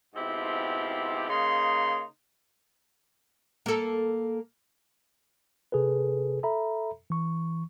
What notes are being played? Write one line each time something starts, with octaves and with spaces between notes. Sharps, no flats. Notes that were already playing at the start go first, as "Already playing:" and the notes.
G#2 B2 C4 E4 F4 G4
C#3 A#3 D#4 C6
A#3 A4
C3 G#4 A4 B4
A4 E5 A#5 B5
E3 C#6